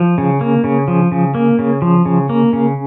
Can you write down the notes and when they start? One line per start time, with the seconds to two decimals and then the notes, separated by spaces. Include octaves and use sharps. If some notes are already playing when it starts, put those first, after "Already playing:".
Already playing: F3
0.18 C#3
0.41 A#3
0.64 C#3
0.88 F3
1.12 C#3
1.35 A#3
1.59 C#3
1.82 F3
2.05 C#3
2.29 A#3
2.53 C#3